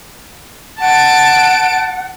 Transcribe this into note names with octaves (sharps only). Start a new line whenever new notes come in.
F#5 A5 D7